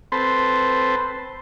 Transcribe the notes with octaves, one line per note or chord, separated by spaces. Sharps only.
C4 A4 B4 C5